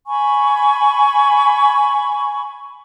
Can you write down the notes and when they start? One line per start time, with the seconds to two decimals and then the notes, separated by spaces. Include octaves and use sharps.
0.07 G#5 B5 C#6